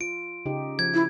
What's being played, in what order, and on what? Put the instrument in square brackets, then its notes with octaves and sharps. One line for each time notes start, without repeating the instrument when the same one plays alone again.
[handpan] F4 [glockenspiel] D7
[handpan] C#3 D#4 G4
[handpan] F3 [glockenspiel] G#6
[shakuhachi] E4